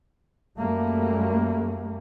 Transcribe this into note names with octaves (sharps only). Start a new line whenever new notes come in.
F#2 G3 A3 A#3